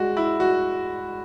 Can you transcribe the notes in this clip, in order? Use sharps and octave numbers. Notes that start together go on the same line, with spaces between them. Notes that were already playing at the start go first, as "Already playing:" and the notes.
Already playing: G#3 F#4
E4
F#4